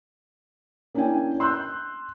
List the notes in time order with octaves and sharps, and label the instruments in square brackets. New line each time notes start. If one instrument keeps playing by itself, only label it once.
[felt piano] A#3 C#4 D4 E4 G5 G#5
C6 E6 F#6 G6